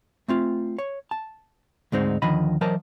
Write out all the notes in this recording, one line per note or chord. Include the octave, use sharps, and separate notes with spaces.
A3 C4 F4
C#5
A5
D2 G#2 G#3 C4 D#4 C5
D#2 D3 D#3 F3 D#5 B5
E3 F#3 A#4 C5 D#5 A5